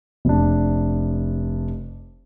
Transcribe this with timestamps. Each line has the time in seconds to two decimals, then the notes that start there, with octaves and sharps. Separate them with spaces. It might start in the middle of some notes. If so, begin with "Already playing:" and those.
0.25 F1 D4